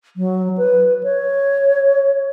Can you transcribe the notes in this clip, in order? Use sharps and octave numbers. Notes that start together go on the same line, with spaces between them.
F#3
B4
C#5